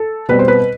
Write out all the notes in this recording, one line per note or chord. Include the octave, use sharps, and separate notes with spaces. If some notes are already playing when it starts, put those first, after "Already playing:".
Already playing: A4
B2 G3 C4 B4
C5
B4